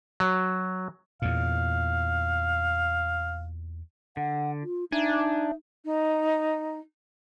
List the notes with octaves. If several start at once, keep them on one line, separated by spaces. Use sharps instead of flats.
F#3
E2 A#2 F5
D3 F#5
F4
D4 D#4 E5 G#5
D#4